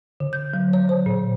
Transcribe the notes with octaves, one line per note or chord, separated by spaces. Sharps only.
D3
G6
F#3
C#5
C5
A#2